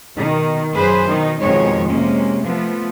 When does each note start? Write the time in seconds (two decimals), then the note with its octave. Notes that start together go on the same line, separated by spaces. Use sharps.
0.17 B2 D#3
0.75 F#2 G#4 B4 C5
1.08 B2 D#3 D#4
1.41 F2 B2 D#3 G#3 C#5
1.89 C3 G#3 A#3 C#4
2.42 F3 A3 B3